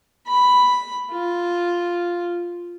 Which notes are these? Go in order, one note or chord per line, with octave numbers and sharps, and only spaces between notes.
B5
F4